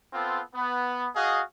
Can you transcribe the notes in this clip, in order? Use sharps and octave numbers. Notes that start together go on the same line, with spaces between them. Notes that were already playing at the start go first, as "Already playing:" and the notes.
B3 C4 F4 A4
B3
F#4 G#4 D#5 F5